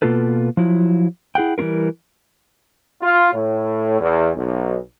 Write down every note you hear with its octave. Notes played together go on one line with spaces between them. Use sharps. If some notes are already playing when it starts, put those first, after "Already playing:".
B2 D#3 A#3 F4 A4 B4
F3 F#3 E4
E4 G#4 F#5 G5
E3 G3 C#4 F4 A#4
F4
A2
E2
B1